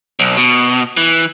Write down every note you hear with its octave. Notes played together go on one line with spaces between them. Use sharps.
B1
B2
E3